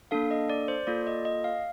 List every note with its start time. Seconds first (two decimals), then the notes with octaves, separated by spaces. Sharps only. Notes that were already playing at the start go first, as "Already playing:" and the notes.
0.11 A#3 D4 A4 F5
0.31 D#5
0.50 D5
0.68 C5
0.87 A#3 F4 A4 D5
1.07 D#5
1.25 D#5
1.44 F5